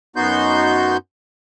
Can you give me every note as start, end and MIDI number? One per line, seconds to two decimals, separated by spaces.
0.16 0.97 42
0.16 0.97 59
0.16 0.97 63
0.16 0.97 66
0.16 0.97 84
0.16 0.97 91